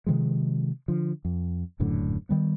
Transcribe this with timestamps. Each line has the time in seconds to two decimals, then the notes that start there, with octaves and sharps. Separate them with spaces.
0.07 C3 D#3 F3 G#3
0.88 D3 F3
1.25 F2
1.80 D#1 F#2 A2 D3
2.29 D#3 G3 B3